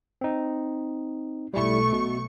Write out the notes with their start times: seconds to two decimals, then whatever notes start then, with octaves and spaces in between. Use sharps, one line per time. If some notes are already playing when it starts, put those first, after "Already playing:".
0.21 C4 D#4
1.54 B1 G3 A3 E4 C#6
1.92 B2